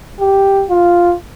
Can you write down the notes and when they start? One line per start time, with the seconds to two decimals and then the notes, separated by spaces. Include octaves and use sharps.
0.20 G4
0.70 F4